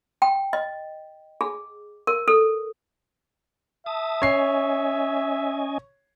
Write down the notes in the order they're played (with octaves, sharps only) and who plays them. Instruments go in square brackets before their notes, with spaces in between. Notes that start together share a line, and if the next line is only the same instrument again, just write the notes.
[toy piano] G5
D#5
G#4
A#4
A4
[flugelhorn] E5 [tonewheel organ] A5 D#6
[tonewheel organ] C#4 D#5 G#5 [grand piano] C#5 C7